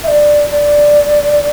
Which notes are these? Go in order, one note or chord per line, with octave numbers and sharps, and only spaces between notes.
E5
D5
D5